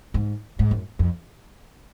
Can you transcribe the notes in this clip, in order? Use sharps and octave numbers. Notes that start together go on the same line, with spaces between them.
G#2
G#2
F#2
F2